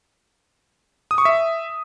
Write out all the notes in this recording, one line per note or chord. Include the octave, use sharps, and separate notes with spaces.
D#6
C#6
E5